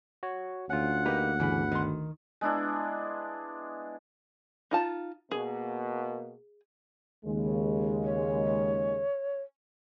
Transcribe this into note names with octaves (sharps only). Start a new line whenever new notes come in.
F#4 C#5
D2 C#4 F4 F#5
A#3 D#4 G4 B4
G1 C#3 E3 B5
D#3 C6
G#3 B3 D4 E4
D#4 F4 A5
B2 A#3 G#4
D#2 C#3 G#3
C#5